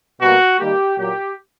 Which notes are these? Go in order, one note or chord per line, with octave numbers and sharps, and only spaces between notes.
B2 G3 A#3 F#4
D#3 G3 A#3 G4
A#2 F#3 A#3 G4